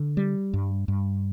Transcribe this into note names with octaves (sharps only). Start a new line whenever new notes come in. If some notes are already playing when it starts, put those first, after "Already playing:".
Already playing: D3
G3
G2
G2